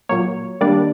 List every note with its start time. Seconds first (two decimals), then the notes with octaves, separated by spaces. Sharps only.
0.09 A#2 F#3 A#3 C#5
0.61 D#3 G3 A#3 D4 D5